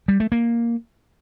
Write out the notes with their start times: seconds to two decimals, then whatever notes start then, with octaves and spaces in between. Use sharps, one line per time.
0.08 G3
0.20 A3
0.32 A#3